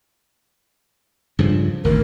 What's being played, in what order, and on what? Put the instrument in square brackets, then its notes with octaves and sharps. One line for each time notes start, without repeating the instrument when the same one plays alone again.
[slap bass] G2 C#3 F3
[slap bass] G#1 D2 [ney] A#4